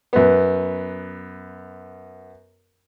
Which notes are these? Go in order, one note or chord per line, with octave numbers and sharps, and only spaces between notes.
F#2 B3